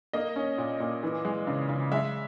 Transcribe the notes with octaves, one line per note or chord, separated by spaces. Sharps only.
A#3 D#5
C#4
A#2
A#2
E3
G#3
C#3
C#3
G#3 E5